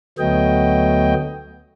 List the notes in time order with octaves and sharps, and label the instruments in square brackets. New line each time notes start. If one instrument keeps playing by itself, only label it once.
[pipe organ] D2 F#3 A3 B3 D#5 G5